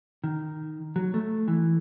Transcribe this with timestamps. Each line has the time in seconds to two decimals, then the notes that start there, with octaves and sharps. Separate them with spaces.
0.24 D#3
0.96 F#3
1.14 A3
1.48 E3